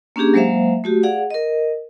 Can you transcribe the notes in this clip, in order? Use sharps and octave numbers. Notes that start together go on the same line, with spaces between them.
A#3 C#4 D4 G4 G#4
F#3 G#3 A#3 C5 E5 F5
A3 F#4 G4
G#4 D5 F5 F#5
A#4 D#5